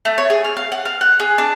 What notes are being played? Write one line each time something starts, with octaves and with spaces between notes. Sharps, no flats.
A3
C#5
G#4
F6
F5
F#5
F5
F#5
G#4
D4